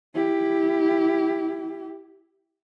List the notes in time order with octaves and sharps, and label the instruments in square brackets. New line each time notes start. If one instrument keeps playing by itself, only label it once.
[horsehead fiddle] E4 G4